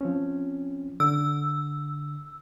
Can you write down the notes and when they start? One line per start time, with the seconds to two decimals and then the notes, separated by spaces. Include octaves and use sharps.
0.01 F3 C4 C#4
1.00 D3 E6